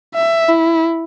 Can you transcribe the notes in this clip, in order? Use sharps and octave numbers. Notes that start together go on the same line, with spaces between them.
E5
E4